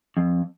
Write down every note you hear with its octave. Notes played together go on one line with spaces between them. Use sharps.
F2